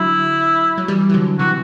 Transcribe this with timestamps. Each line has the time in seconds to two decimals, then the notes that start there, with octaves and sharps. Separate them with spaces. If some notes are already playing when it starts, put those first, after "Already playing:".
Already playing: D3 F#3 E4
0.78 F#3
0.88 E3 G3
1.09 E3
1.14 D3 F#3
1.39 C3 E3 F#4